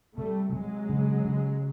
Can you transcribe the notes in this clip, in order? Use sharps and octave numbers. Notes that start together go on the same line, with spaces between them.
C3 G3 A3
C3 F#3 G#3
C#3
C#3